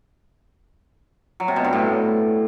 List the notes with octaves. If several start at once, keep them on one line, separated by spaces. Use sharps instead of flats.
F#3
C3
B2
G2
A2